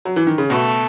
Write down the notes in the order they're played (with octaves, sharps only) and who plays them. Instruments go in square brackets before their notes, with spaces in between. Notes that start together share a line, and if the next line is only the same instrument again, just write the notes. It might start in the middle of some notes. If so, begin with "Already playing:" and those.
[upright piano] F#3
E3
D#3
C#3
[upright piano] B2 [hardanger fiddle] A3